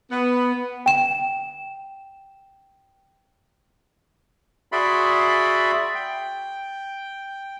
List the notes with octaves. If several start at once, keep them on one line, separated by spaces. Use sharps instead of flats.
B3
G5 E7
F#4 G#4 D5 E5 B5 C6
G5